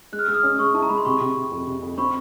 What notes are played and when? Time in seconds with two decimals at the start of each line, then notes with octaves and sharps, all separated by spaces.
0.12 G#3 F#6
0.19 F6
0.26 G#3 E6
0.34 D#6 F6
0.43 C#4
0.58 G#3 C#6 D#6
0.74 E4 A5
0.82 A#5
0.89 G#3 B5
0.98 C6
1.05 C3 B5 C#6
1.20 C3
1.36 C3
1.51 F2
1.67 C3
1.83 F2
1.98 C4 B5 C#6